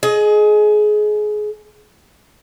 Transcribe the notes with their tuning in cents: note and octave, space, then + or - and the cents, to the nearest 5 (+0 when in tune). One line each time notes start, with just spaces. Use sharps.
G#4 +25 D#5 +0